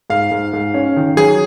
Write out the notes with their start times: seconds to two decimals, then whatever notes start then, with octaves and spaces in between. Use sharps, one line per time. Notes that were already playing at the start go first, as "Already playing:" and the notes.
0.10 G#2 F5
0.32 G#2
0.53 G#2
0.74 C#4
0.96 D#3
1.17 F#3 G#4